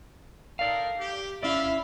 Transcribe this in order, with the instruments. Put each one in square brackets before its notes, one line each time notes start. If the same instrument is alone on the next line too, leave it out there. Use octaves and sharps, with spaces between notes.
[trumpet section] D#4 A4 A#4 [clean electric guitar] D5 F5
[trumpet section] G4
[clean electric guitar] C#4 D5 [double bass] E4 [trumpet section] E5 F5